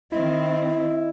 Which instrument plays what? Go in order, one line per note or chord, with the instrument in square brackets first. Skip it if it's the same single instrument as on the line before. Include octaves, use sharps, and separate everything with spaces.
[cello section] D#3 C4 [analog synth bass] E4 [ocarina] D#5